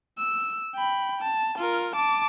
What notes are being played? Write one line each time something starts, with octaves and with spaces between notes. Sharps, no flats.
E6
G5 B5
A5
F4 A#4
A5 D6